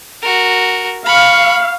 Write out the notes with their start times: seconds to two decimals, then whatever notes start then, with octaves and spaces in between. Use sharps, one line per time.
0.22 F#4 A#4
1.06 F5 B5 C#6